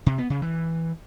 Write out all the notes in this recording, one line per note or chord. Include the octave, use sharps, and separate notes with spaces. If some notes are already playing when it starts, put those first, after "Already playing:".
C3
B3
C#3
E3